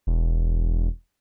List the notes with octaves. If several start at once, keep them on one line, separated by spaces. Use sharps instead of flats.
E1